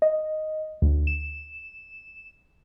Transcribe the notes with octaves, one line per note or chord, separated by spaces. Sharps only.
D#5
D2
E7